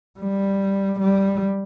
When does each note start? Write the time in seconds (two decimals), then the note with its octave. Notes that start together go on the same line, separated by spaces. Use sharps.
0.19 G3
0.99 G3